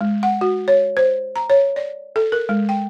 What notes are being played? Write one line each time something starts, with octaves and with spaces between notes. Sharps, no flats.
G#3
F#5
F#4
C#5
C5
A#5
C#5
D5
A4
A#4
G#3
G5